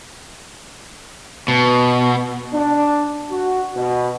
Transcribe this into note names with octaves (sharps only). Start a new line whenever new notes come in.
B2
D4
F#4
B2